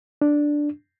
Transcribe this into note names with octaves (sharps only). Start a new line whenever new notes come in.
D4